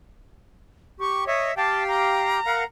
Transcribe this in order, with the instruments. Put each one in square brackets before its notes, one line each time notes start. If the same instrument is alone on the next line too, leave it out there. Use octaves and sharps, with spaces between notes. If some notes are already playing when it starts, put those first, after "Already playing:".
[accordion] G4 [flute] C#6
[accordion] C#5 D#5 [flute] E5
[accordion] G4 F5 G5 [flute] A5
[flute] A#5
[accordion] A#4 F5 F#5